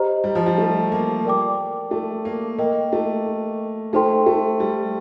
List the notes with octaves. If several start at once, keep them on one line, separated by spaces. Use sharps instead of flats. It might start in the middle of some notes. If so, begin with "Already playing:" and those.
Already playing: G4 C5 D#5 A#5
G3
F3
G3
A3
A#3
A#4 D5 G5 D6
A3
A#3
A#3 A#4 D#5 G5
A3
A3 D#4 A4 C5 G5 C6
A3
G3